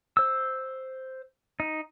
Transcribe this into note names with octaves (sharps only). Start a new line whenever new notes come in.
C5 E6
D#4